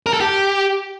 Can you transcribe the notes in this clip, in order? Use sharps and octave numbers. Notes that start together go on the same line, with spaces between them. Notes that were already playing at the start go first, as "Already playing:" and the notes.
A#4
A4
G4